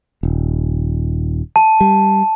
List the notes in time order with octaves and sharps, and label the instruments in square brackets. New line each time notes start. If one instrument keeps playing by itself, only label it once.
[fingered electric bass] D#1
[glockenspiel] A5
[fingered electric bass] G3